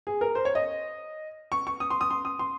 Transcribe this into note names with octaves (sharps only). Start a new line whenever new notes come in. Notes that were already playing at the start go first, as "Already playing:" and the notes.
G#4
A#4
C5
C#5
D#5
C#6
C#6
D#6
C6
D#6
C6
D#6
C6